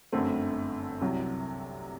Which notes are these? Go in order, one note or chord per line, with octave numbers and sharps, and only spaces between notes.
G1 F#2 D3 A3 C4
C2 C3 F#3